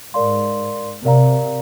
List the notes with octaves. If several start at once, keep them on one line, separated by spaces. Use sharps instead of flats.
G#2 A#4 D5 F5 C6
C3 A#4 D5 F5 A#5